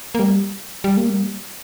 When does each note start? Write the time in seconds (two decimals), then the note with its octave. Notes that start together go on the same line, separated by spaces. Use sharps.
0.15 A#3
0.19 G3
0.84 G3
0.97 A#3
1.10 G3